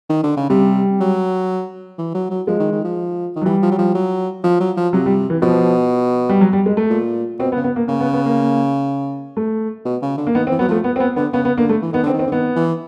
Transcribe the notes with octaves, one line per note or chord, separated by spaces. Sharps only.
D#3
D3
C#3
C3 G3
F#3
E3
F#3
F#3
F3 G#3
D#3
D#3
F3
D#3
F#3
E3 G3
F3
F#3
F3
F#3
F3
F#3
F3
C3 F#3
G3
E3
B2 F3
G3
F#3
G3
G#3
A3
A#2
B2 C4
B3
C#3
B3
A#3
C#3 A#3
B3
B3
A#3
A3
B2
C#3
D3
A#3
D#3 B3
C4
E3
F#3 B3
F3 A3
B3
C4
B3
D3 B3
C#3 B3
B3
D3 A#3
A3
E3
D#3 B3
D3 C4
D#3
C4
D3
D#3 B3
E3